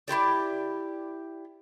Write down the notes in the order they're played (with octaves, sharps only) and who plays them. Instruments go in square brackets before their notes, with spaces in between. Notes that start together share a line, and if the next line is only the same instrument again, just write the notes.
[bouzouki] E4 F#4 G4 D5